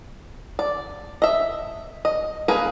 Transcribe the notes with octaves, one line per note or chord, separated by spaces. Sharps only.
D5
D#5 E5
D#5
A#3 G#4 A#4 B4